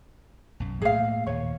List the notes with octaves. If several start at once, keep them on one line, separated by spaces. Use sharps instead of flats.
B1 F#2
A2 A3 A#3 G#4 F5
D#2 A#2 C#5